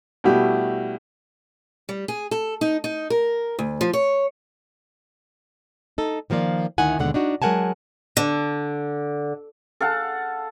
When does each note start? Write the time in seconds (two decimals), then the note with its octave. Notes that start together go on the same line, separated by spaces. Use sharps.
0.24 B2 G3 A3 E4 F#4 G4
1.89 G3
2.08 G#4
2.31 A4
2.61 D#4
2.84 D#4
3.10 A#4
3.59 D2
3.81 F3
3.93 C#5
5.98 D#4 A4
6.30 D#3 F3 A#3 F4 D5
6.78 D2 D#3 D#4 E4 F#5 G#5
6.99 D#2 B2 D3 G#3 F#5
7.14 D4 D#4 F#4
7.42 F#3 G#3 A#4 F#5 G#5 A5
8.17 D3
9.80 A4 F5 F#5 A5